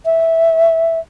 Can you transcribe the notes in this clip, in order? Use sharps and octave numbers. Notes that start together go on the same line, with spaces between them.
E5